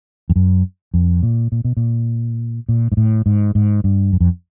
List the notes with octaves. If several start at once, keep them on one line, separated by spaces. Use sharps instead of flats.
F2
F#2
F2
A#2
A#2
B2
A#2
A#2
G#2
A2
G#2
G#2
G2
F#2
F2